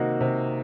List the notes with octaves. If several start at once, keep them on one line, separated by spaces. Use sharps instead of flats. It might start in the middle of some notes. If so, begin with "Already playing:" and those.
Already playing: C3 D#3 A#3 D#4 F#4
C3